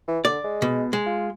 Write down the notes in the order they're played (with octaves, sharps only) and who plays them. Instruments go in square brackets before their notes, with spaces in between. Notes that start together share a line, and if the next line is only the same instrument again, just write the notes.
[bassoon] E3
[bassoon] D3 [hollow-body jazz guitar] D5
[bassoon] G#3
[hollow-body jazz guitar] B2
G#3
[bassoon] F4